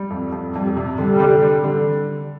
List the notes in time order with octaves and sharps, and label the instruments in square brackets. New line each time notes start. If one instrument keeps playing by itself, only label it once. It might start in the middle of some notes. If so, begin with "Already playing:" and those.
Already playing: [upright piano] G3
F2
F2
[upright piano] F2 [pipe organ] G3
[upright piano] C3
[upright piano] D3 [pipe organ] G3
[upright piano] D3
G3
D3